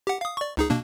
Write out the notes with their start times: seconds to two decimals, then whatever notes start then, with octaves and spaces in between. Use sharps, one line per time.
0.07 G4 F#5
0.21 F5 D#6
0.37 D5 C#6
0.57 C#2 D#4 G#4
0.70 B2 A#3 D4